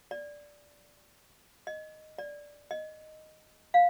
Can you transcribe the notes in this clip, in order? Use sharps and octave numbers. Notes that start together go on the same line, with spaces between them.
D5
D#5
D5
D#5
F5